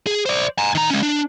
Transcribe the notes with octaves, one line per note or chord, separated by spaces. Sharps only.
G#4
C5 D5
G#5 A#5
D#3 A#5
G#3 C#4
D4